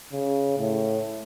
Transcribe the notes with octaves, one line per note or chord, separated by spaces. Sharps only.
C#3
A2